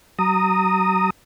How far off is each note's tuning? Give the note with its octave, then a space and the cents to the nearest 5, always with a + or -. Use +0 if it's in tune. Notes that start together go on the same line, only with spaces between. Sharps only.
F#3 +35 A#5 -15 D#6 +0